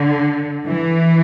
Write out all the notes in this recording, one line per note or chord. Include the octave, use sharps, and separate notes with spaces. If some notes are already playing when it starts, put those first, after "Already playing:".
Already playing: D3
E3